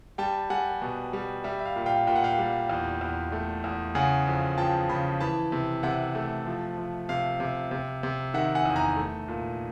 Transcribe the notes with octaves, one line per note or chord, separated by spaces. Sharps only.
G3 G5 A5
G3 F#5 G#5
B2
G3
G3 E5
E5
F5
A#2
F5 G5
A#2 G5
F#5
F5 G5
G3
E2
E2
A3
E2
C#3 F#5 G#5
F2
F3 G5 A5
C#3 A5 B5
E3 A5 B5
C3
C3 E5 F#5
A3
F3
F3
C3 F5
C3
C3
C3
D#3 E5 F#5
F#5 G#5
E2
G#5 A#5
A3
A#2